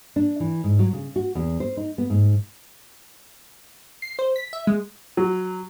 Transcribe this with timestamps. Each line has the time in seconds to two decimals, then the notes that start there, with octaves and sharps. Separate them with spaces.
0.16 D4
0.40 E3
0.64 G#2
0.79 F#3
0.93 C#3
1.16 F#4
1.35 E2
1.60 C5
1.77 D#4
1.98 B3
2.10 G#2
4.02 C7
4.19 C5
4.36 B6
4.53 E5
4.67 G#3
5.17 F#3